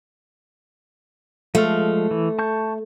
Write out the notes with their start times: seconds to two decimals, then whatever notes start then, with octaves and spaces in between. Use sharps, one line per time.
1.55 F3 G#3 A3 F5
2.11 E3
2.39 A5 C#6 G6